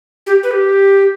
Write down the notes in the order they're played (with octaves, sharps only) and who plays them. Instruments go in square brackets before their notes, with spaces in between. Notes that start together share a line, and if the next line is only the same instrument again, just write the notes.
[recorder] G4
B4
G4